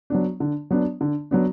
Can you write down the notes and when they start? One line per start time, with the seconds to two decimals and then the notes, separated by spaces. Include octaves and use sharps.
0.10 F#3 B3 D4
0.40 D3
0.70 F#3 B3 D4
1.01 D3
1.31 F#3 B3 D4